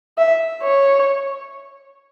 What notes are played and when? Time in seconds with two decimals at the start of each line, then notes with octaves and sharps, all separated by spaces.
0.18 E5
0.62 C#5